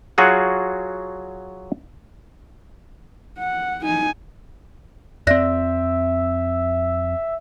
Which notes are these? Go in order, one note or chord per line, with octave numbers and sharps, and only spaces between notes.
F#3 F4 F#4 G#4 F#5
F#5
D#4 G#5
F2 C4 D5 E5 F#6 A#6